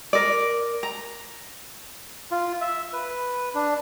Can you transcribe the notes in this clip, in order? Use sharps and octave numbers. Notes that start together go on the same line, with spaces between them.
A#4 D5
A#5
F4
E5
B4
D4